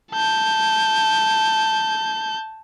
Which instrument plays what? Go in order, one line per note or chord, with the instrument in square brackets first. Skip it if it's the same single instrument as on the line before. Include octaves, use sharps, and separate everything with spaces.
[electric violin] A5 G6